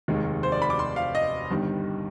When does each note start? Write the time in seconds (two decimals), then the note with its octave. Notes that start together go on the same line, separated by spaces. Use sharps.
0.08 F1 D#2 D#3 G#3
0.43 C5
0.52 D5
0.62 B5
0.70 D6
0.79 C6
0.96 F5
1.15 D#5
1.51 G1 G2 D#3 G3